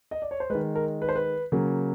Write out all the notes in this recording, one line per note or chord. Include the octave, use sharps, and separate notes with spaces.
D#5
D5
C#5
C5
G#3 B4
D#3
A#4
B4
C5
B4
C#3 F#3 A#3